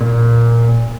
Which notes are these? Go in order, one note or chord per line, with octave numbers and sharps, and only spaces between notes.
A#2